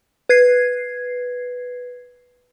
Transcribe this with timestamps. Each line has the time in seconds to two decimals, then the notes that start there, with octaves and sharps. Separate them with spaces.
0.29 B4 G#6 C7